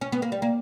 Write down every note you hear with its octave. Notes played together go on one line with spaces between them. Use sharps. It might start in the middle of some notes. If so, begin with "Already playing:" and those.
C#4
B3
A#3
G3
A#3